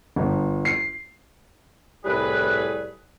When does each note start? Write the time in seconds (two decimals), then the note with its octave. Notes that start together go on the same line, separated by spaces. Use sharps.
0.16 G1
0.65 C7
2.04 C2 A2 G3 G#4 B4